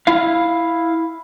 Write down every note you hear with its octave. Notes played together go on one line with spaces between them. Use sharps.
E4 F5